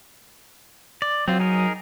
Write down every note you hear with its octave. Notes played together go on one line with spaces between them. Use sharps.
D5
F#3 C4 F4
D#4 G#4 A#4